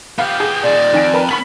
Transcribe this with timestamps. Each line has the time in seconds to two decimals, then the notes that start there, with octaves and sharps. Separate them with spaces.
0.19 B3 G4 F5
0.40 G#4
0.63 A#2 D#3 D5
0.94 F2 D#3 G#5 D7
1.14 A#4 B4 A5
1.29 B3 C#4 B5 B6 F#7